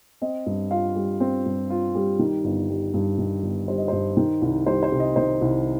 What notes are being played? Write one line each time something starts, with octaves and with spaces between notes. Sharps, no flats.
C4 D#5
G2
F4 F5
G3
C4
G2
F4
G3
D#3
G1
G3
G2
D#3
G1
G3 C5
D#5
G2 C5
D#3
C2
G3 C5
C5
C3
D#5
D#3 C5
C2